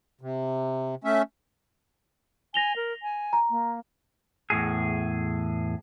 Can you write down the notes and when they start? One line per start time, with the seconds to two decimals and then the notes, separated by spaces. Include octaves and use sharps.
0.21 C3
1.04 A3 C#4 E5
2.54 G#5 A#6 F7 G7
2.76 A#4
3.03 G#5
3.33 A#5
3.50 A#3
4.50 E2 A2 G#4